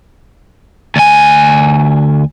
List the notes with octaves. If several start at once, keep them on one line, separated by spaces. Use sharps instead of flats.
D2 G#5